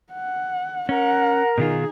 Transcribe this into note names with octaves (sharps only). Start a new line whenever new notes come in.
F#5
C#4 A#4 F#5 A#5
B2 D#3 D#4 F4 G#4